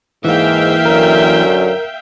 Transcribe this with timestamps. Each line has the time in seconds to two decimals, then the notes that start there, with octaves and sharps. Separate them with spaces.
0.25 G#2 E3 A#3 E5 F5 G5
0.86 F#2 D3 F#3 A#4